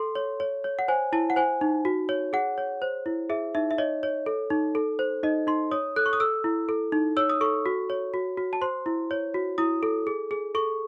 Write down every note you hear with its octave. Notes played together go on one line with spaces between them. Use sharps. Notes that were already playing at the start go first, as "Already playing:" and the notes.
Already playing: A4 C6
C#5
C#5
C#5
F#5
C5 G#5
E4 A5
F#5
C5 G#5
D#4
F#4
C#5
G#4 F#5
C#5
C5
E4
G#4 E5
D#4 E5
E5
C#5 D#5
C#5
A4
D#4
A4
C5
D#4 D#5
D#4 C6
C#5 D#6
A4 F#6
C#6
D#6
A4 E6
E4
A4
D#4
C#5 E6
D#6
A4 C#6
F#4
C#5
F#4
F#4
A5
C5 C6
E4
C#5
F#4
E4 D#6
A4
G#4
G#4
A4 C#6